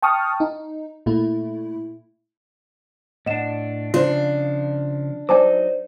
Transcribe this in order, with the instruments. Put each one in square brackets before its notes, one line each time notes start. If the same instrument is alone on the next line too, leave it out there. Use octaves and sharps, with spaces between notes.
[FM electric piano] G5 A5 C#6 D#6 F6
D#4
A#2 A3 E4
[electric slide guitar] A2 D4 [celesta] D#5 F#5 E7
[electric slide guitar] C#3 F3 [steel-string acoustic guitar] D4 [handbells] F4 C5
[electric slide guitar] F#3 D#4 [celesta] C5 D5 [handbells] G#5 A5 D6